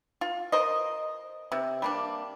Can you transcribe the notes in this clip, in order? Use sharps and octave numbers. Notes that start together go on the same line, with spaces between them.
F4
A#4 C5 D#5
C3
G3 A#3 D4